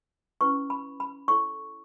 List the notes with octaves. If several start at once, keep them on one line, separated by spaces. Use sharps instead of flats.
C#4 E4 B4 C#6
B5
B5
E4 A4 C#5 C#6